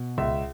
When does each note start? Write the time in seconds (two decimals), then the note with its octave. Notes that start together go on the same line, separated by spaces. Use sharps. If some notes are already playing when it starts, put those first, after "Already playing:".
Already playing: B2
0.18 C#2 E5